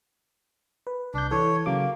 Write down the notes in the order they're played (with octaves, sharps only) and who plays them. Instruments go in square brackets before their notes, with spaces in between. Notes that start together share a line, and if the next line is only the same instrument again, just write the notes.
[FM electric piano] B4
[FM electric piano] C2 G6 [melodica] D4
[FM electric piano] E3 A4 [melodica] C#5
[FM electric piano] C#3 F#3 D6 [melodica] A#3